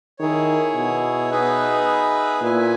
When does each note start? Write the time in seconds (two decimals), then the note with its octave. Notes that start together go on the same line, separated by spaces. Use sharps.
0.19 D#3 E4 G#4 C#5
0.75 B2
1.30 B3 D#4 G#4 B4 E5
2.42 A#2 E4 B4 E5 G#5